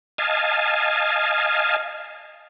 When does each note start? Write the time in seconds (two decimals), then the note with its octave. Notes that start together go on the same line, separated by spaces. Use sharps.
0.18 D#5 F5 G#5 A5